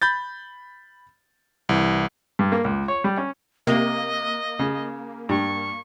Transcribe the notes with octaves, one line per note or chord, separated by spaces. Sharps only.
B5 G6 A6
C2 E3
G2
A#3
C#2
C#5
G3
C#4
C3 A#3 D#5
C#3
G2 C#6